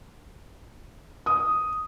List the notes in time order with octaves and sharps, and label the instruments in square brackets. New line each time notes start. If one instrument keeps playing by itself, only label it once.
[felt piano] D#6